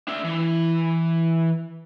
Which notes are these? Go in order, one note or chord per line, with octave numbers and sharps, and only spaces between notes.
D4 E5
E3